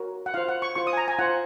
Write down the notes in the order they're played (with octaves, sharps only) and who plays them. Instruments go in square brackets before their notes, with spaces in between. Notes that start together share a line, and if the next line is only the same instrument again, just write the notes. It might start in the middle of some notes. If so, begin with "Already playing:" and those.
Already playing: [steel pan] F#4 A#4 C#5
F#5
F4 C5 F5
F#5
C#6
F4 C5 C#6
D#6
G#5
A#5
G#5
F4 C5 F#5